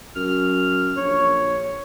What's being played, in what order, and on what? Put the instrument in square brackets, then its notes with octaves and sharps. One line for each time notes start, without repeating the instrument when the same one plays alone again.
[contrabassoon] F#2 [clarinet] F6
[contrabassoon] A#1 [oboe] C#5